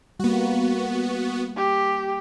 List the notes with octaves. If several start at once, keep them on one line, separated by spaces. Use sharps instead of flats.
G3 A#3 B3 F#4
G4